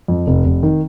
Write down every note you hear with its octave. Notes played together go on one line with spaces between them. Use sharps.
F2
F1
F1
D#3